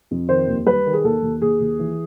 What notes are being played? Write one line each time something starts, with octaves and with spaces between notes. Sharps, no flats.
F2
D#3 C5
D#2
G3 B4
D#3
G#4
D#2 A4
D#2
D#2 G#4
D#2
E3